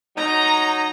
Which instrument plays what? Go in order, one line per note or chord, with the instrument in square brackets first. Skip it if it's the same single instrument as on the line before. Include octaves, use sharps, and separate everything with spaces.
[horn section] F#3 D#4 [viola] A#5